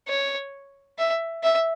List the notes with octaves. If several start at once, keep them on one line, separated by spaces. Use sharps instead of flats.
C#5
E5
E5